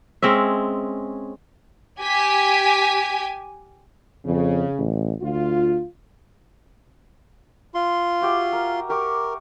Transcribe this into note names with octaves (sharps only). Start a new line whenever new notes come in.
G#3 C4 C#4 E5
G4 G#5 G#6 B6
F2 C#3
A1
D2 F4
F4 C6
F#4 G4 E5
A#4
G4 A#4 C#6 D6